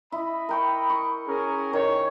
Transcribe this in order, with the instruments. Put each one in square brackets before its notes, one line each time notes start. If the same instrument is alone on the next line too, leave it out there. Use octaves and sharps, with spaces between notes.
[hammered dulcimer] E4 [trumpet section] D#5 B5
[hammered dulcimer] A#4 G5 C#6
C#6
[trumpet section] C#4 G#4 A#4
[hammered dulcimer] D#3 [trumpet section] C#5